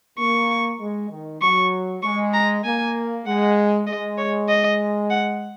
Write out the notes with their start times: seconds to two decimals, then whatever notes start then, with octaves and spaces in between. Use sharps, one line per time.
0.18 A#3 C#6
0.80 G#3
1.10 D#3
1.41 F#3 C#6
2.03 G#3 C#6
2.33 A#5
2.64 A#3 G#5
3.26 G#3 F#5
3.87 G#3 D#5
4.18 C#5
4.48 D#5
5.10 F#5